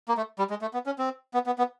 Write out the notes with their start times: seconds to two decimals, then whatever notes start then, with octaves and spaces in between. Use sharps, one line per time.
0.08 A#3
0.17 A3
0.39 G3
0.50 G#3
0.61 A3
0.74 B3
0.86 C#4
0.98 C4
1.34 B3
1.46 B3
1.58 B3